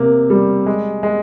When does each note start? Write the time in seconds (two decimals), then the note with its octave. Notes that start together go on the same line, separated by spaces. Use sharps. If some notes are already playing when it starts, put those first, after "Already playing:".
Already playing: C3 A#3
0.30 G3
0.66 G#3
1.03 G#3